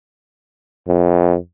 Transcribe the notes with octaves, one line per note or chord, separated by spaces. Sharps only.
F2